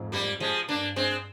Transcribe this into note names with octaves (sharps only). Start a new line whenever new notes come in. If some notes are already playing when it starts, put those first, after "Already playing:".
Already playing: F2 G#2
G3 A#3
F3 G#3
G2 A#3 D4
G#3 C4